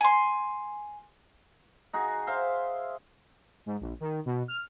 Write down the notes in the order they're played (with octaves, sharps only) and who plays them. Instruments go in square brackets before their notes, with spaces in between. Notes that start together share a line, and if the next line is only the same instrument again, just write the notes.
[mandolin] G#5 C6
[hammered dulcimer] D#4 F#4 G#4
C5 E5 F5 C6
[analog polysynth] G#2
A#1
D#3
B2
F6